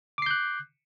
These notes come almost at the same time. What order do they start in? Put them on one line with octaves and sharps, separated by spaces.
D6 C7 G6 F#6